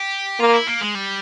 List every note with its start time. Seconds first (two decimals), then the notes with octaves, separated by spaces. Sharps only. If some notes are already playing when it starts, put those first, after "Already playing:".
Already playing: G4
0.39 A#3 F4
0.53 E4
0.67 A#3
0.81 G#3
0.95 G3